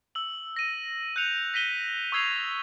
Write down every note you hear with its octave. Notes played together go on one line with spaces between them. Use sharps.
E6 F#7
A#6 D#7
F#6 G6 C#7 F7
A#6 B6 D#7 G7
C#6 D#6 E6 G#6 C7 F7